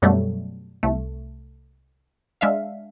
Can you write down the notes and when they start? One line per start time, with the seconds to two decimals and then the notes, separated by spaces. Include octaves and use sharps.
0.02 F#2 B2 F#3 G3 A3
0.83 C2 A3
2.41 G#3 D4 E5 F5